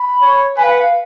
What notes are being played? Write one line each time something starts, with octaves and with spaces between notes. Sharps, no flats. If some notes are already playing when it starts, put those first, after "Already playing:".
Already playing: B5
C#5
B4 G#5
F5
F#5
F5